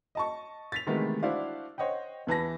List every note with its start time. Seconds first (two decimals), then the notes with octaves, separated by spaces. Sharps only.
0.15 D#5 A5 C#6
0.72 A6 B6 F7
0.86 C3 D#3 E3 G#3 A3 B3
1.23 D4 E4 F#4 C5 D5 F5
1.78 C5 C#5 D#5 F#5 G5
2.27 E2 E3 A5 A#6